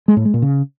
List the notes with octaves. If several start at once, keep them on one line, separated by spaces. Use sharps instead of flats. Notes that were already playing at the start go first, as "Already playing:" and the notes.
G#3
A2
G#3
A#2
C#3